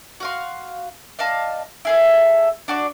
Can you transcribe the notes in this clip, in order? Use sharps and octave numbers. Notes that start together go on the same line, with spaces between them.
F#4 F5 C6
D5 D#5 F5 A5
E4 G#4 A4
D4 F#4 D5